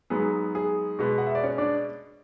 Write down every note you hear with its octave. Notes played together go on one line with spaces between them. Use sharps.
G#2 F#3 B3 G#4
G#4
B2 G#3 B3
F#5
E5
D5
C#4 C#5
D4 D5